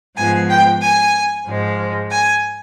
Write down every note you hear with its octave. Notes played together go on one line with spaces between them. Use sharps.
G#2 F3 G#3 B3 G#5
G5
G#5
G#2 F3 G#3
G#5